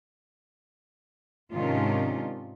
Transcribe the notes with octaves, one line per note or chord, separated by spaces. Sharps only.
G#2 C3 D#3 C#4 D4 F4